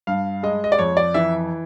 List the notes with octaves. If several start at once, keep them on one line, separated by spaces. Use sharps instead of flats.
G2 F5
G#3 D#5
D#5
D5
F2 C#5
D5
E3 E5